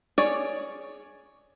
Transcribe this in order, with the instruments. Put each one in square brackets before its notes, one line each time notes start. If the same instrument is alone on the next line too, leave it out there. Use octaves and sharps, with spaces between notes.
[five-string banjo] G#4 C#5 D5